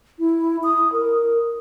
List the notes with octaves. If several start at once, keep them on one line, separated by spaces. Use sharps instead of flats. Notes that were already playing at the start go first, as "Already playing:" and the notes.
E4
D#6
A#4